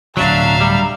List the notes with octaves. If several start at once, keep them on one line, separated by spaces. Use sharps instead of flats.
D1 B2 F#3 D4 E5 F5 A#5
G3